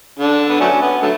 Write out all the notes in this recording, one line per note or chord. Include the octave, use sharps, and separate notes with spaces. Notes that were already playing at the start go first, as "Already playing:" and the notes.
D3 D4
B3
F#3 A3 C#4
B3
D3 F#3 A3